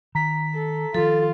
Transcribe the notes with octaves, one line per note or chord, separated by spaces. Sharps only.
D#3 A#5 B6
A4
D#3 F3 F4 A4